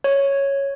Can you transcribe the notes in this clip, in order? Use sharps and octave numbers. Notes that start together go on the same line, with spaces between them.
C#5